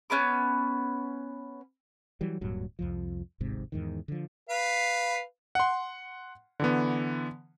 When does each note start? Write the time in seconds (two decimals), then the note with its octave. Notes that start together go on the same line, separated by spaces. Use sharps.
0.10 B3 C#4 B4 D6
2.21 E3 F#3 G3
2.41 D1 G2 A#2 F#3
2.79 C2 F2 F3
3.40 D1 G#1 G#2 C3
3.72 E2 G#2 D#3
4.08 D3 F3
4.49 B4 F5
5.55 F#5 C6
6.60 D3 E3 B3